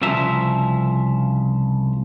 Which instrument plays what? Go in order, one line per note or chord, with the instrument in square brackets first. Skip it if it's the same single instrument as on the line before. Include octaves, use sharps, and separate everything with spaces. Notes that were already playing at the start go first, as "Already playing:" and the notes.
[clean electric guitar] C2 C#3 F3 E5 A#5